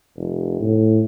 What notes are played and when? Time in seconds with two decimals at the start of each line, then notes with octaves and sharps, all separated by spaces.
0.17 F1
0.61 A2